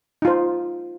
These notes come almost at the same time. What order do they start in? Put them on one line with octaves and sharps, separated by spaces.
D#4 F4 C5